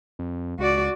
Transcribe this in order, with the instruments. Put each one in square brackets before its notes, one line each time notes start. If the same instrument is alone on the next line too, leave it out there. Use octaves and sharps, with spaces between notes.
[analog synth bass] F2
[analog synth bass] C#2 [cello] F#4 D5